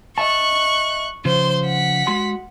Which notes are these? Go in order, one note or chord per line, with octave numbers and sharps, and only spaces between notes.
D#5 E5 A5 C#6 F#6
C#3 F3 C5 C6
F#5 B6
G#3 F#4 C6